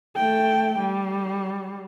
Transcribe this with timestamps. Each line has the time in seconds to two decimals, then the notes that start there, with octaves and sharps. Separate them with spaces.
0.16 A3 G5
0.78 G3